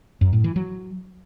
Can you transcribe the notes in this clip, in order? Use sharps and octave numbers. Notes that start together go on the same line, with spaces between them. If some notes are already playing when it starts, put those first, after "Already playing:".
F#2
A2
E3
F#3